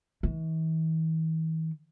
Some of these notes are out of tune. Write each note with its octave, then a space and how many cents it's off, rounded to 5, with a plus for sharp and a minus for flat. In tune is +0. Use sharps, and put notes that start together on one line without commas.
E3 -45